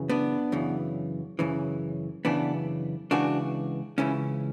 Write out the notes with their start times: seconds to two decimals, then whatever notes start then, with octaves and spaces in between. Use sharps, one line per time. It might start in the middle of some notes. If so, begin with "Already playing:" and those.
Already playing: F#2 C#3 E3
0.09 B3 D4
0.52 F#2 C#3 E3
1.39 F#2 C#3 E3
2.25 F#2 C#3 E3 B3 D4
3.11 C#2 C#3 E3 D4 F#4
3.98 C#2 C#3 E3 C#4 E4